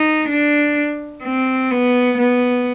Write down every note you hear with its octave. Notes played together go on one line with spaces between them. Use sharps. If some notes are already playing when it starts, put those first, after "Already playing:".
Already playing: D#4
D4
C4
B3
B3